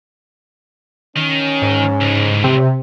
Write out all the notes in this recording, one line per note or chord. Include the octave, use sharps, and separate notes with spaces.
D#3 C#4
G#2
C#2 A2
C3